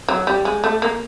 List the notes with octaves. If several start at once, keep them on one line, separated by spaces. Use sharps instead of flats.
F#3
G3
G#3
A3
A#3